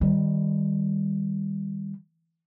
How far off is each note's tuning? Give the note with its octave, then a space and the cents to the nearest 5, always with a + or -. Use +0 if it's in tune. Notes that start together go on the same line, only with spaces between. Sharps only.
D#3 +0 G3 +15